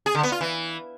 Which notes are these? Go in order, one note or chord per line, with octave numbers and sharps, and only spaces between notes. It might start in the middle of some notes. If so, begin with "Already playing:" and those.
G#4
D3
B3
F4
E3